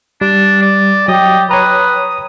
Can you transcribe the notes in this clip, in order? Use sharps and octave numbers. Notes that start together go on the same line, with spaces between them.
G3 D4
D5
F#3 G4 D#5
B4 C#5 A#5 D#6